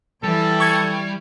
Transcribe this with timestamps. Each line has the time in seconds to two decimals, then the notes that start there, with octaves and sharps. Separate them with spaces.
0.23 E3 G3 A4 G5
0.60 C#6 G#6